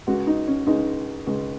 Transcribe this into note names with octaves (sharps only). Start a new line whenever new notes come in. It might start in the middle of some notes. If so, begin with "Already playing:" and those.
C#2 C#3 G#3 F#4
D#4
C#4
C#2 C#3 G#3 D#4
C#2 C#3 G#3